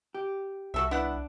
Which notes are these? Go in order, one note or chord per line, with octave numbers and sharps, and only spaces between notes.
G4
C2 F#4 A4 E5
B3 D4 E4 F#5